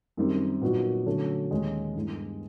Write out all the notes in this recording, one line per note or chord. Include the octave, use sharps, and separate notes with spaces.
F#2 D#3 G3 C4
A#2 F#3 B3 D#4 F#4
D3 F#3 A3 C#4
D#2 D#3 G#3 C#4
G2 E3 G#3 B3